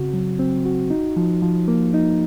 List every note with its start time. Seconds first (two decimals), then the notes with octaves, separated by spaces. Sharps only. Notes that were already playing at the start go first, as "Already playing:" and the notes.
Already playing: C#3 C4 F#4
0.14 F#3
0.39 C4
0.65 F#4
0.90 D#4
1.17 F3
1.42 F3
1.68 A#3
1.94 D#4